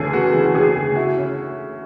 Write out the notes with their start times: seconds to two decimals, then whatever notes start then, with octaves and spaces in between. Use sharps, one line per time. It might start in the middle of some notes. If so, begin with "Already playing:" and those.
Already playing: D2 C#3 E3 B3 G#4 A4
0.13 B3 F#4
0.34 E3
0.45 F#4
0.55 C#3 G#4
0.75 D2
0.96 E4 F#4
1.17 C#4